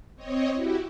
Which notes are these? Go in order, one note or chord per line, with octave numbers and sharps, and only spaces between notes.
C4 C#5 D#5
E4 F#4 G4